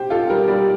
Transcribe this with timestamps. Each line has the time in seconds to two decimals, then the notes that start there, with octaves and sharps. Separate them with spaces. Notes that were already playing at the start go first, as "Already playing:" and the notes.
Already playing: G4 C5
0.10 F4 A4
0.30 G3 A#4
0.48 G3 D5